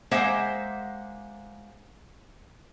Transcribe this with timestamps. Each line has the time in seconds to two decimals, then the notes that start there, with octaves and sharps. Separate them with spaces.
0.11 G#3 A#3 C5 E5 F#5